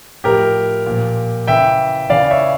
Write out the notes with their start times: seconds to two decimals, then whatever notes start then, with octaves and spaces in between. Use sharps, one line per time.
0.24 A2 F3 G4 A#4
0.86 A#2 F3
1.47 C#3 E3 E5 G5
2.10 C#3 E3 D5 F5
2.31 C#5 E5